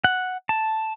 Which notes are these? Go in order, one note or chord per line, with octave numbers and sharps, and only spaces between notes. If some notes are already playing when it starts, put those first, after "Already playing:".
F#5
A5